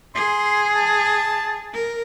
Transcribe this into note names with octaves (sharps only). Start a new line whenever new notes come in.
G#4 C6
A5
A#4